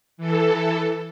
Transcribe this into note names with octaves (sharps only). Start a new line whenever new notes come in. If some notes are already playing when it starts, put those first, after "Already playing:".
E3 A4